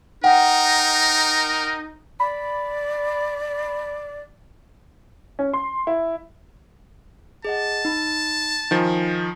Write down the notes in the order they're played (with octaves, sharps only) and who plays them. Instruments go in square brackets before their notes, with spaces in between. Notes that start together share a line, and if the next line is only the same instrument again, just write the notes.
[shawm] D#4 [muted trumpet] A#4 [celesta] F#5 G5
[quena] D5 [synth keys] B5
[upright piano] C#4
C6
E4
[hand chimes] G#4 D#5 F#5 [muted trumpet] A5
[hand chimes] D#4 B5
[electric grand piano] D#3 F3 [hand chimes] D#4 G#5